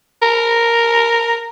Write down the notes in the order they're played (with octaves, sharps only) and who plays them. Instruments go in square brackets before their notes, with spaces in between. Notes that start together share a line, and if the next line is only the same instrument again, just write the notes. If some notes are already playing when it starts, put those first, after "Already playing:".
[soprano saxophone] A#4